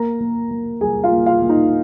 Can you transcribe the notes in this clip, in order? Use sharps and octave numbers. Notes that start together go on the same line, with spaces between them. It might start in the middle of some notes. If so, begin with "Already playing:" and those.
Already playing: A#3 A#4 A#5
A#3
A#3
G3 G#4 G#5
F4 F5
A#3
F4 F5
A#3
D#4 D#5